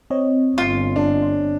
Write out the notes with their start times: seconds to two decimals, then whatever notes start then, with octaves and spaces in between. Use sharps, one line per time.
0.10 C4 C#5 D#5
0.58 G1 F4
0.96 D4